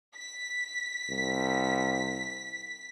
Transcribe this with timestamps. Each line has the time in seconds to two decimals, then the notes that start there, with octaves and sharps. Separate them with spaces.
0.16 B6
1.11 C2